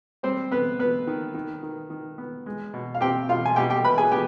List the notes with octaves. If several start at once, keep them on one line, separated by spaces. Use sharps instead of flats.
G3 C4 C5
B3 B4
B3 B4
D#3
D#3
D#3
D#3
B3
G#3
B2
F5
C4 G4 G5
B2 F4 F5
G#5
B2 G4 G5
G4 G5
B2 B4 B5
G#4 G#5
B3 G4 G5